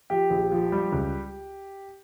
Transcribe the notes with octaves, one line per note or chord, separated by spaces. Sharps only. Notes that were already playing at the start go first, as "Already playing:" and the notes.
F3 G4
A#1
F3
G3
C#2